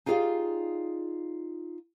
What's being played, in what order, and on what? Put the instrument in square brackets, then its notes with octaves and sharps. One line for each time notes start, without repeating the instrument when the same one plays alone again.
[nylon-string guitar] D#4 F4 G4 G#4 D5 F5